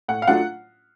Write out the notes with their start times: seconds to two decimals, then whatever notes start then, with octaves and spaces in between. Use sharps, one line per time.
0.08 A2 F#5
0.22 F5
0.28 F#3 A3 D4 F4 F#5